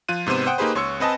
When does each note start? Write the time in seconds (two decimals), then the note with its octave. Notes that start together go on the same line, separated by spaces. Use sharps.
0.09 F3 F4 F#6 D#7
0.26 G#2 C3 B3 C5 D#7
0.46 C5 F#5 G5 D#6 F#6
0.58 A#3 D#4 G4 G#4 B4 C5
0.75 C#2 C#5 C6 C#6 E6 C#7
1.00 C4 B4 D#5 G#5 A5